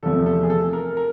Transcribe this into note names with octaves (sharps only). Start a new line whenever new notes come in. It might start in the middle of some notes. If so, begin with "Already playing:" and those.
E2 C3 F3 A3 A4
A4
G#4
A4
A#4
A#4